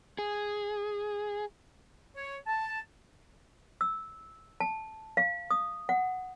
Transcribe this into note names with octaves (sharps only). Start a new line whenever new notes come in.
G#4
C#5
A5
E6
A5
F5
D#6
F#5